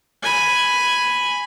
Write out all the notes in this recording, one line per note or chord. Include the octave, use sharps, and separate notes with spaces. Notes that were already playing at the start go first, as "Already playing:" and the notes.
G#5 B5